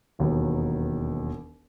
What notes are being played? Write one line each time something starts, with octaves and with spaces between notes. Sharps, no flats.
E1 D#2 D#3 F#3 B3